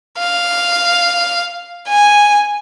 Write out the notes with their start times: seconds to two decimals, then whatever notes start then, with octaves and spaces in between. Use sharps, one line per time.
0.19 F5
1.88 G#5